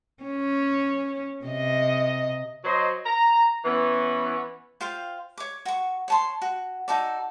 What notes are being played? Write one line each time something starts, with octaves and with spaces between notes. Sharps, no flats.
C#4
C3 D#5
F#3 C5 D#5
A#5
E3 B3 C#4
F4 C5 F5 G5
C#5 D6
F#4 C#6
C#5 A5 C6
F#4
D#4 F#4 A4 D5